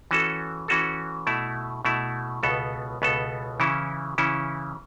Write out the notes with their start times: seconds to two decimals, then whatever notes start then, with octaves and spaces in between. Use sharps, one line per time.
0.11 E3 C#4 F#4 A4
0.68 E3 C#4 F#4 A4
1.27 B2 A3 E4
1.85 B2 A3 E4
2.43 C#2 B2 B3 A4
3.02 C#2 B2 B3 A4
3.60 C#3 E3 C#4 E4
4.18 C#3 E3 C#4 E4